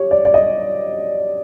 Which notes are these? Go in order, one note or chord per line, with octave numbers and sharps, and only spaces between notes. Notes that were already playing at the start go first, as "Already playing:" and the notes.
Already playing: G4 C#5
D5
D5
D#5